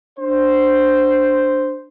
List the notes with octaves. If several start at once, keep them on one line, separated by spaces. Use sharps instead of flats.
D4 C5